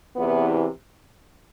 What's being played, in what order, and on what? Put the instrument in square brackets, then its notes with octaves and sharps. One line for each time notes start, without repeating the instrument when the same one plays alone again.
[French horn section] E2 C3 E3 B3